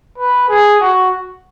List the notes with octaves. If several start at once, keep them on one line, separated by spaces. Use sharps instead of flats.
B4
G#4
F#4